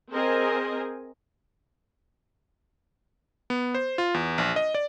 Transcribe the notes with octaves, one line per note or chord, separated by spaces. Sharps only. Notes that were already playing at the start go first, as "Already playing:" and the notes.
C4 G#4 A#4 C5 D#5 G#5
B3
C5
F4
E2
A#1
D#5
D5